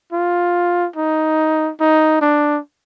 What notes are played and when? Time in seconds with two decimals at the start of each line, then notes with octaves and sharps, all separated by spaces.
0.13 F4
0.96 D#4
1.80 D#4
2.22 D4